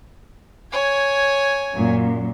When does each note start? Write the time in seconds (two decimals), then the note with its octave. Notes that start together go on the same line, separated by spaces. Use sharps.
0.72 C#5 G#5
1.74 F#2 A#2